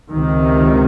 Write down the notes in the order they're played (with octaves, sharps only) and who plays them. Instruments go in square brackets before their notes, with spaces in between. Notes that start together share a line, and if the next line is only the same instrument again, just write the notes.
[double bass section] C#2 C3 D#3